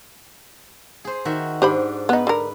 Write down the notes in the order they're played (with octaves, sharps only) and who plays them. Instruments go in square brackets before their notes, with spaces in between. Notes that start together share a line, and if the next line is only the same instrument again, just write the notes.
[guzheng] G#4 C5
D#3 F#4 E5
[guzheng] G#2 D4 [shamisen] G4 C5 B5
[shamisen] B3 D#4 [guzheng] B4
[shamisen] D3 A#4